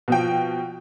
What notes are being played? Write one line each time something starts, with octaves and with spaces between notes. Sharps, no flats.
B2 F3 G5